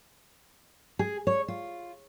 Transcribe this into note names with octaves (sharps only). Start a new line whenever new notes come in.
G#4
C#5
F4